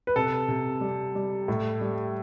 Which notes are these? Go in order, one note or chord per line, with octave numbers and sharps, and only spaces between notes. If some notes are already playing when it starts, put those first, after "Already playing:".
B4
C3 A4
C3
G3
G3
A2
G3